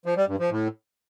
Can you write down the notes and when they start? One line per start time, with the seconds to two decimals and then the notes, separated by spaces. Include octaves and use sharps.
0.06 F3
0.17 G3
0.28 G2
0.39 F3
0.51 A2